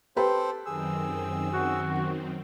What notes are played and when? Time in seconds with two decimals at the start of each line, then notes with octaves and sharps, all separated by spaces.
0.17 C4 G4 A4 B4 C5
0.66 F#2 D#3 C4 G#4 E6
1.53 F#4